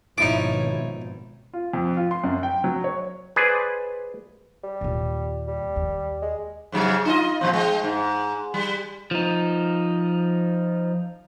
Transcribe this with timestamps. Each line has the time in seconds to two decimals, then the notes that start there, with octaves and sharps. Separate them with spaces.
0.18 G#1 B2 F3 D#4 E4 C#5 D6
1.53 F4
1.74 F2
1.97 F4
2.11 C6
2.24 F#2
2.43 G5
2.64 F#3
2.84 C#5
3.36 G#4 B4 C5 D5 G#5
4.64 G3
4.81 D#2 A#2
5.48 G3
5.76 D#2
6.22 G#3
6.72 G#2 C#3 F#3
7.05 D#4 F4 D#5
7.41 A#2 F3 C4
7.53 G#3
7.84 G#2
8.54 G3
9.11 F3 D#4